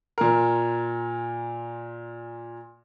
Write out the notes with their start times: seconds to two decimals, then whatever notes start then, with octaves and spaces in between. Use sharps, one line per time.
0.18 A#2 A#4